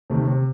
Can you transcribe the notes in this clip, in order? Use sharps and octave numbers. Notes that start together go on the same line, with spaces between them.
C3 D#3 A3
C3